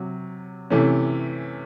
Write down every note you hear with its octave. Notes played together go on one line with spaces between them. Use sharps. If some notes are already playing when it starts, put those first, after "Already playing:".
Already playing: C3 F#3
C3 E3 A3 C#4